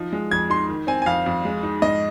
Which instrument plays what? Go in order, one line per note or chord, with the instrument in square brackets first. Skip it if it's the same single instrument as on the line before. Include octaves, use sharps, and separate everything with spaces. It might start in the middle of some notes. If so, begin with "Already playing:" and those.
Already playing: [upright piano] F3 D#4
G#3
[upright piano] F2 [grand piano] G#6
[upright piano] D#4 [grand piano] C6
[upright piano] D#3
[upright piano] C4 [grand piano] G#5
[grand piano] G#5
[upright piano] F2 [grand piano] F5
[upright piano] F2
G#3
D#4
[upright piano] G#2 [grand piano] D#5